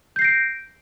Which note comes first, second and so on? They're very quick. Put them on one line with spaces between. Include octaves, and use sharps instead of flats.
G6 C7 A#6 D7